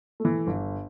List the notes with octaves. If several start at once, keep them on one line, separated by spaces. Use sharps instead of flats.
E3 A3
G1